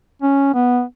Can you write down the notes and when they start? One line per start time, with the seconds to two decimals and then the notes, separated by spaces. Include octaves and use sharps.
0.22 C#4
0.54 B3